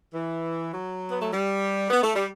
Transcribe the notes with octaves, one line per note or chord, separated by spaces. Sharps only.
E3
F#3
B3
A3
G3
B3
A3
G3